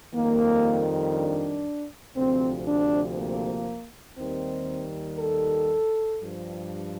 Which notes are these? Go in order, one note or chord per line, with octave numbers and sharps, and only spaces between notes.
F2 D#3 G3 A#3
D4
D2 C3 F3 C4
D4
A#3
D#2 D#3 G3 C4
A4
G2 F3